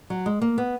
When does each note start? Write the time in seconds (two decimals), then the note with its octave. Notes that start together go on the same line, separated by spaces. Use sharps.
0.10 F#3
0.26 G#3
0.41 A#3
0.58 B3